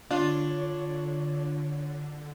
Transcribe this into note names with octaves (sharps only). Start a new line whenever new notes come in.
D3 D4 F4 C#5